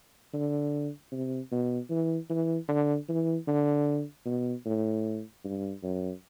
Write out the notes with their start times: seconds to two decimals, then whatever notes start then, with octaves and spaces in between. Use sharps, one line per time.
0.34 D3
1.12 C3
1.52 B2
1.90 E3
2.30 E3
2.68 D3
3.09 E3
3.48 D3
4.26 B2
4.65 A2
5.45 G2
5.83 F#2